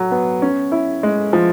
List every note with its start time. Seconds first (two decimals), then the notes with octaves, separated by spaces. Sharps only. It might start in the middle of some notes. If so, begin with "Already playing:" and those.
Already playing: F#3
0.11 B3
0.42 C#4
0.72 E4
1.03 G#3
1.33 F3